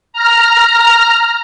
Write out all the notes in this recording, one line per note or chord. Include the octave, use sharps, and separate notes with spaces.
A#5 F6